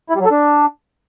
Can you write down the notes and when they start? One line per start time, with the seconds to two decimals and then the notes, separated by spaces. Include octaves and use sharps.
0.10 E4
0.15 G3
0.20 F#3
0.25 A4
0.31 D4